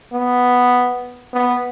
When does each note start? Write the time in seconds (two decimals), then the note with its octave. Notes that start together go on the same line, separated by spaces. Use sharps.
0.14 B3
1.34 B3